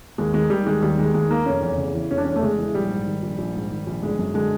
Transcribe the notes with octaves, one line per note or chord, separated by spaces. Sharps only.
D#2 G#3
D#3 G#3
D#2 G3
D#3 G#3
D#2 G3
D#3 G#3
D#2 G#3
D#3 A#3
F1 C#4
E2
C#3
E3
F1 C#4
D4
E2 C#4
A3
C#3 G#3
E3
A#1 G3
G#2
D#3
A#1
A#1
G#2
D#3
A#1
G1 G#3
F#2
D3 G#3